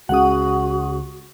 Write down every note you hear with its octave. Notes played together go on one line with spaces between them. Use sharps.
C#2 C#3 F#4 F#5 D#6